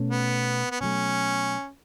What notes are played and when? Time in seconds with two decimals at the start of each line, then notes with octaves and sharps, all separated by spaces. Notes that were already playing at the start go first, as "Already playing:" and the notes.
Already playing: B2 A3 C#4
0.10 B3
0.71 B3
0.80 B2 F#3 A3 C#4